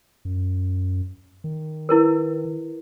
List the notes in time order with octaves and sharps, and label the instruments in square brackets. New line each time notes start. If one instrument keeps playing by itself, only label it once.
[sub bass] F#2
D#3
[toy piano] E4 A#4 B4